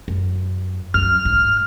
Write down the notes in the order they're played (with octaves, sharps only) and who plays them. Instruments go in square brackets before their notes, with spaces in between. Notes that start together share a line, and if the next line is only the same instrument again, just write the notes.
[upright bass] F#2
[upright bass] F#2 [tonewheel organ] F6
[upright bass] G#2